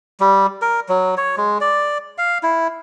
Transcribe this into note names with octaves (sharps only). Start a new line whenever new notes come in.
G3
A#4
F#3
C#5
G#3
D5
F5
E4